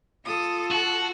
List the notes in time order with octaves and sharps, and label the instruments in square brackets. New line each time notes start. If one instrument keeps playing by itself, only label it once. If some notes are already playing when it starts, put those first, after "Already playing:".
[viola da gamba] F4 A4 [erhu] D#6
[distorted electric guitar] F#4 [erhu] A5